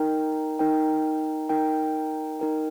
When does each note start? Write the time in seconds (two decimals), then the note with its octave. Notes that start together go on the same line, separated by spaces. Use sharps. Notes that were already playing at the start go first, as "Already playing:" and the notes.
Already playing: D#4 A#4 G5
0.59 D#4 A#4 G5
1.49 D#4 A#4 G5
2.40 D#4 A#4 G5